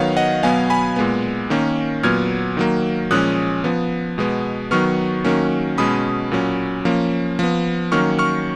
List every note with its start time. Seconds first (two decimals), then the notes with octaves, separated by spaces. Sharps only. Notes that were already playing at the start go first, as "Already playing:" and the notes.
Already playing: D#3 F#3 B3 C#5 F5
0.17 D#5 F#5
0.43 B2 F#3 B3 F5 G#5
0.70 G#5 B5
0.96 A#2 G#3 B3
1.50 D#3 A#3 C#4
2.03 A#2 F#3 B3 F6 G#6
2.57 D#3 F#3 A#3
3.11 A#2 F3 G#3 C#4 D#6 F#6
3.64 F3 B3
4.18 B2 G#3 B3
4.71 D#3 F#3 B3 C#6 F6
5.25 D#3 F#3 A#3 C#4
5.78 B2 G#3 C#4 B5 D#6
6.32 A#2 F#3 C#4
6.85 F3 A#3 C#4
7.39 F3 B3
7.92 D#3 F#3 A#3 C#4 C#6 F6
8.19 C#6 F6